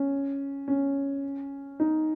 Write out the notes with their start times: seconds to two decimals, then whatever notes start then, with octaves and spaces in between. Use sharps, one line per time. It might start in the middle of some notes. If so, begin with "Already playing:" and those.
Already playing: C#4
0.68 C#4
1.80 D#4